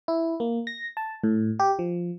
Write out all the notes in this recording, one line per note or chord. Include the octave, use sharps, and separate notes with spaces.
E4
A#3
A#6
A5
A2
G4
F3